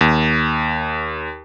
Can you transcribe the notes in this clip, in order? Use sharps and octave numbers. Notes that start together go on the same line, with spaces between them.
D#2